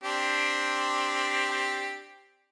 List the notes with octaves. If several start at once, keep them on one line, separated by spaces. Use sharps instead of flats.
C4 D4 G4